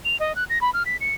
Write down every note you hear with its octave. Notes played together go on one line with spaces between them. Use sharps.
F7
D#5
F#6
A#6
B5
F6
B6
C#7